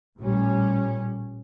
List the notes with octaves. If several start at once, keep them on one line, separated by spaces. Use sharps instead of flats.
A1 A#2 G3 C#4